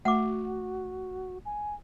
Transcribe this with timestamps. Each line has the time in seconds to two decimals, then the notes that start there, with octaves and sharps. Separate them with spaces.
0.05 A3 F#4 F#5 D6
1.45 G#5